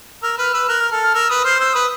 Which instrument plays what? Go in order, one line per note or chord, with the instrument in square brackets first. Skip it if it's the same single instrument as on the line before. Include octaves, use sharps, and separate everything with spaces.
[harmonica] A#4 [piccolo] E6
[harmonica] B4 [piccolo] F6
[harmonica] B4 [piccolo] E6
[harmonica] A#4 [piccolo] F#6
[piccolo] F6
[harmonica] A4 [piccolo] F6
[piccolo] F6
[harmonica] A#4 [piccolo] E6
[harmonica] B4 [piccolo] D#6
[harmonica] C5 [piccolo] F6
[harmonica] C5 [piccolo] E6
[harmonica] B4 [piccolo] D#6